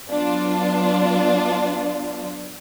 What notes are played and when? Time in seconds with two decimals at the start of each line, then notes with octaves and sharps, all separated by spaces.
0.11 F#3 B3 D4 F4